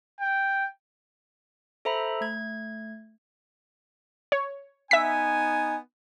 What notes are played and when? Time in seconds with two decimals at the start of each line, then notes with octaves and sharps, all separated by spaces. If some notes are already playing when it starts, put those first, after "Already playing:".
0.21 G5
1.85 A4 C5 E5 A#5 B5
2.21 A3 G#6
4.32 C#5
4.91 B3 D#4 E5 G#5 B6